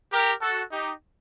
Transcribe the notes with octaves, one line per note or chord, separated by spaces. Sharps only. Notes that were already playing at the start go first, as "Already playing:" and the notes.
G4 A#4
F#4 A4
D#4 G4